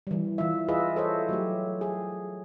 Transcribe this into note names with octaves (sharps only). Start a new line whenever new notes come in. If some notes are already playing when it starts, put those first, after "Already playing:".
E3 G3
E3 F4 E5
F4 G#4 B4 D#5 E5
A4 C5 C#5 D#5 E5
F#3 A3 G4
G#4